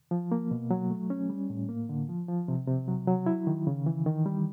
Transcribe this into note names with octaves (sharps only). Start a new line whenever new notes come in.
F3
A#3
B2
F#3
A3
C#4
G3
A2
A#3
D3
F3
F3
C3
C3
F#3
F#3
E4
D#3
C#3
E3
D#3
G3